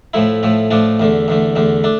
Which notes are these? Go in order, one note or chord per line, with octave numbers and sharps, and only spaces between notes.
A2 F3 A3 E4
A2 F3 A3
A2 F3 A3 D4
E2 D3 A3
E2 D3 A3
E2 D3 A3
A3 D4